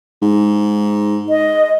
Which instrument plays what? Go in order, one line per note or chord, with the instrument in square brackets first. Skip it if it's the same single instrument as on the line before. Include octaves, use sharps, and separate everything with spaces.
[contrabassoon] G#2
[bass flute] D#5